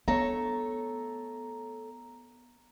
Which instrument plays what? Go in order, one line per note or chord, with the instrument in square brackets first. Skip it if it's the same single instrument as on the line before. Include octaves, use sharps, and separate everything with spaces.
[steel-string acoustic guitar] A3 A4 C#5 [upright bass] B3 [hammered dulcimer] A#5